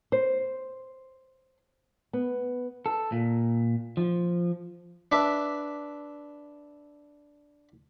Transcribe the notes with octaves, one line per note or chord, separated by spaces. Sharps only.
C5
B3
A4
A#2
F3
D4 B4 E5